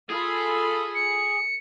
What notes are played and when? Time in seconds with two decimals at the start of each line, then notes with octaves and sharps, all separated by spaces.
0.10 F4 G#4 A4 B5
0.95 C#7